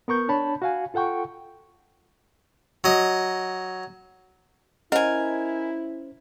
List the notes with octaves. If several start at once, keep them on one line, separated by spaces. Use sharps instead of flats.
B3 A#4 C#6 G6
D4 C#5 A5 B5
F#4 F5 G#5
F4 A4 F#5 G5 C#6
F#3 D#5
C#4 E4 A#4 C5 D#5 F#5 G#5